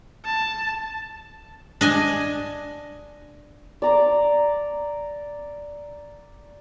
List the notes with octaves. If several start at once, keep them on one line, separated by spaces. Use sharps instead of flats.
A5
D4 D#5 G#5
D5 A#5 D6